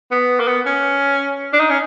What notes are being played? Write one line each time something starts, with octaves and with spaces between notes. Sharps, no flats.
B3
A#3
B3
C#4
D4
D#4
C#4